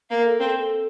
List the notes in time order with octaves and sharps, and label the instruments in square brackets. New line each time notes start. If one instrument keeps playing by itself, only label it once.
[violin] A#3 [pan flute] F5
[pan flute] A4
[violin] C4 [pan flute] A4
[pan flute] A4